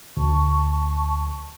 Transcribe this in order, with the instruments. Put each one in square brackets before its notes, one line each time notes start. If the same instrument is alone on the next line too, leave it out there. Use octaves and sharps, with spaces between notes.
[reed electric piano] D2 [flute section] A5 C#6